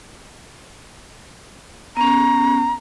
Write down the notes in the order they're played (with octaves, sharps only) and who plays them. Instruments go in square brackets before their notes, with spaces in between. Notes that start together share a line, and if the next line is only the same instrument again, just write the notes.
[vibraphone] B3 C#4 [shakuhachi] A#5